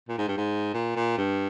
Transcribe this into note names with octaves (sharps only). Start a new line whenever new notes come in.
A#2
G#2
G2
G#2
A#2
A#2
G2